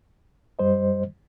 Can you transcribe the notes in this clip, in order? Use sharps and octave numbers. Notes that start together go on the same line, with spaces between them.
F#2 G3 C5 D#5